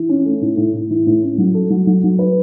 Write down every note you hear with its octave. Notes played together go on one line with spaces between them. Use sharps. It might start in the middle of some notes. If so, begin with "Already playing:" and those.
Already playing: E3
C#4
A3
A2
A2
A2
E3
A2
C#4
F#3
A4
F#3
F#3
F#3
B4